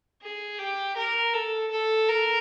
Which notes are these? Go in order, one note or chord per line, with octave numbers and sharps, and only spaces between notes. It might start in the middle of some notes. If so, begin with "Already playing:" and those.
G#4
G4
A#4
A4
A4
A#4